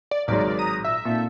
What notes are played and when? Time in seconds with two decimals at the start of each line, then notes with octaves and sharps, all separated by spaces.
0.11 D5
0.28 G#1 C#3 F#3 G#3 A#4 D5
0.59 A#5 D#6
0.84 A#2 E5 A#5 E6
1.05 A#2 C4 D#4 A4